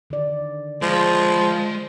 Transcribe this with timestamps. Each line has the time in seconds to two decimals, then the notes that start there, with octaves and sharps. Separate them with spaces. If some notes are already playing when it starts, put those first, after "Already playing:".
0.10 D3 D#3 D5
0.82 F3 G#3